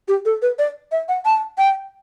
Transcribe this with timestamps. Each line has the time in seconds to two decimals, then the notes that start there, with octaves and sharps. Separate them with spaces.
0.08 G4
0.25 A4
0.42 B4
0.59 D5
0.92 E5
1.09 F#5
1.25 A5
1.58 G5